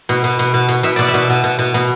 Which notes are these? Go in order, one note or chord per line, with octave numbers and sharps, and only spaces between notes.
B2
B2
B2
B2
B2
B2 E5
B2 D5
E5
B2
B2
B2
B2
B2